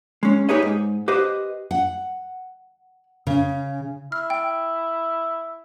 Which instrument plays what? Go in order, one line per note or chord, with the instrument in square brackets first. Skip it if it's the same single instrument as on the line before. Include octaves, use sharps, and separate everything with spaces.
[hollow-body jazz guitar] G#3 C#4
D#4 G4 G#4 B4 C#5 D#5
G#2
G4 B4 C5 D#5
[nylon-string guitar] F#5
C#3
[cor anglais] E4 [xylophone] F6
[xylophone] G5